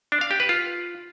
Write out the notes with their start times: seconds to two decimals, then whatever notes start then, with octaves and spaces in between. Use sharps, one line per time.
0.12 D4
0.21 F5
0.31 G4
0.40 B4
0.49 F4